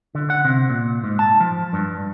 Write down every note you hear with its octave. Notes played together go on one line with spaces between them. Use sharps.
D3
F#5
C3
A#2
G#2
A5
F3
G2